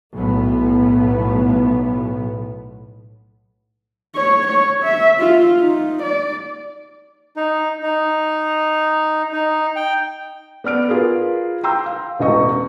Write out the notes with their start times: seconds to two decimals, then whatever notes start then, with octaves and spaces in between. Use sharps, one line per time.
0.14 B1 A2 B3
4.15 C#5
4.47 C#5
4.83 E5
5.20 F4
5.60 D#4
6.03 D5
7.36 D#4
7.83 D#4
9.33 D#4
9.76 G5
10.64 B3 D5 F6 D7
10.88 F4 G#4 A#4 B4
11.64 G5 A#5 C6 E6 G6
11.86 F5
12.19 E1 A1 D#5 C#6